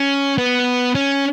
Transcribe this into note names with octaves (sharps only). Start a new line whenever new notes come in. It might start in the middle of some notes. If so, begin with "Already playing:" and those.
Already playing: C#4
B3
C#4